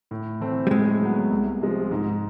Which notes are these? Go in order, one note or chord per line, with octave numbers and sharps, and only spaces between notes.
A2
E3 A3 C4
G3
A2 G#3
F#3 B3
C2
C3 F3 G#3
G#2